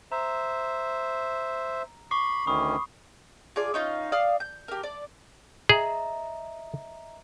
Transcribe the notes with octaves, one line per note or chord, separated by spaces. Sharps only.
C5 E5 A#5
B5 C#6 D6 C7
D2 D#3 C#4 B5 C#6 D#6
F4 G#4 D5
C#4 D#4 F4
D5 F5 D#6 F6
G6
G4 A#4
D5
G#4 D#5 E5 A#5